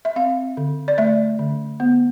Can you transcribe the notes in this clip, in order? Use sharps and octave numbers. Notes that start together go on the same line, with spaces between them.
E5
C4 F5
D3
D5
A3 E5
D3
B3